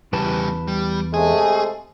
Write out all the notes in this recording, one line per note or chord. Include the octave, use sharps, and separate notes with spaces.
E2 C#3 G3 B4 A5
G3
C3 G#3 A3 G#4